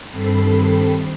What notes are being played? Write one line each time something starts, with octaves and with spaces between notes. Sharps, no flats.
G2 D#3 C4 A4 B5 C7